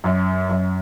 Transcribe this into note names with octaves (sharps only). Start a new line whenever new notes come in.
F#2
F#2